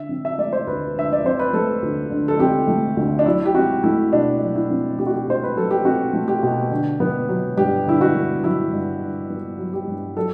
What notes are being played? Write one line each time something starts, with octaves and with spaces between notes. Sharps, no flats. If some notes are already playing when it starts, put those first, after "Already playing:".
Already playing: D3 E5
C4
E5
A3 D5
C5
D2 B4
D3 E5
D5
C4 C5
B4
A3 A4
D2
D3
A4
C4 G4
A3
D2
D4
F#3 E4
G4
C4 F#4
A3 E4
B2 D4
F#3
E4
C4
A3 G4
F#4
G4
B2 C5
B4
F#3 A4
G4
C4 F#4
A3
G4
B2
D3
B3
F#3
G2 G4
D3 E4
F#4
B3
F#3 E4
G2
D3
B3
F#3
G4
G2
F#3 A4